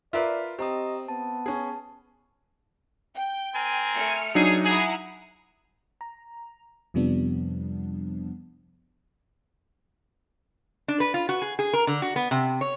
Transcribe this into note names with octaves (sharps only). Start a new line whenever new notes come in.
F4 A#4 B4 D5 E5
C4 G4 D#5 A#5 D#6
B3 A5
C#4 G#4
G5
C4 A#4 G#5
A3 F6 C#7
F#3 D4 D#4 G#4
E4 G#4 F#5 A#5
A#5
F2 C3 F3 G3 B3 D4
D4
B4
F4
F#4
G#4
G#4
A#4
D3
F#4
B3
C3
C#5